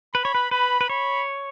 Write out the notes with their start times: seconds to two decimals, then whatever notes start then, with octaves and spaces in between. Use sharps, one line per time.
0.14 B4 B5
0.25 C#5
0.35 B4
0.51 B4 B5
0.81 B4
0.90 C#5 B5